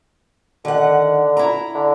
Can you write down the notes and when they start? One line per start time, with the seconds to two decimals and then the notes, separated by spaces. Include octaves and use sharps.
0.65 D3 D#3 F#5
1.37 E4 A#5
1.75 D3